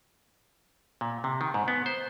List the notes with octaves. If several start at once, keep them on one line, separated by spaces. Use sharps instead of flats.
A#2
C3
D#3
G#2
B3
C5